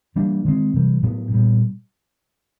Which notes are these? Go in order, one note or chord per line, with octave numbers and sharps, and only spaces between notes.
E3 G3 A#3 D4
D#3 G#3 C4
C3 E3 G3
A2 F#3 B3
A#2 G3 B3